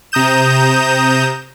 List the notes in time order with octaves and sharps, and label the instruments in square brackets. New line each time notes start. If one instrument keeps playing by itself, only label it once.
[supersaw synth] C3 A#5 D#6 G6 E7